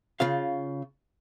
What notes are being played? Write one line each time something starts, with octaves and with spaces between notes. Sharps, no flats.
C#3 F4 F5